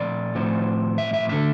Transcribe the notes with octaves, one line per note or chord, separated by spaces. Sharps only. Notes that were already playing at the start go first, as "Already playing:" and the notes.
Already playing: A#2 F3 A3 C4 D5
A2 F3 C4
E5
E5
D3 A3 E5